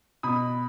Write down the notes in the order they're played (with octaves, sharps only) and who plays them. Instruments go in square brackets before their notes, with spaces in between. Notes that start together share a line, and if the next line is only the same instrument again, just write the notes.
[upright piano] B2 B5 D#6